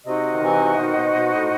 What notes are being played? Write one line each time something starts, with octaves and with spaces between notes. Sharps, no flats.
C3 D#4 F#4 C5 D#5
D#3
C3 E3
B2 D#3
B2
B2
A2